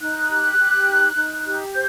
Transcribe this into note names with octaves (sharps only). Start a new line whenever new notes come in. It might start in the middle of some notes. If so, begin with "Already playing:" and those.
D#4 F#6
G4
G4
D#4
D#4
G4
C5 G6